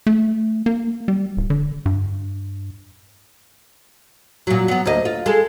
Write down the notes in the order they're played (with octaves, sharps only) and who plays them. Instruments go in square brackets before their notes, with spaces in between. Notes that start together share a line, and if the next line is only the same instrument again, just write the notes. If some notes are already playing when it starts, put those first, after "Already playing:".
[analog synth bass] A3
A#3
G3
D1
D3
G2
[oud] A#2 F#3
F#3 B3
D2 A#3 D#5
F4
G#3 A4